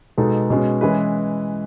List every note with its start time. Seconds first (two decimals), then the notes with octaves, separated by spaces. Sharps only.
0.18 B2 G#3 B3 D#4 A4
0.50 B2 G#3 C#4
0.81 E3 G#3 C#4 E4 B4